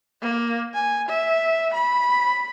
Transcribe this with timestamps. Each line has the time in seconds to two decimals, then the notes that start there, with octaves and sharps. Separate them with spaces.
0.22 A#3
0.74 G#5
1.09 E5
1.74 B5